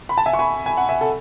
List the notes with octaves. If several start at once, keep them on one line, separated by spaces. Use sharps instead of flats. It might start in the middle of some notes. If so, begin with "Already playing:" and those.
B5
A5
E5 G#5
C#6
G#5 B5
G#5
F#5
E5 G#5
A4